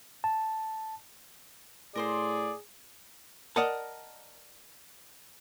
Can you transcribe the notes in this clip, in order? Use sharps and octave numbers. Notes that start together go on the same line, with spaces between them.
A5
A2 G#4 A#4 C5 D5 C6
A#4 D5 D#5 F#5 A5